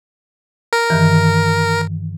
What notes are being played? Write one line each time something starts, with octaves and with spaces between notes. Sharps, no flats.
A#4
G2 D#3 E3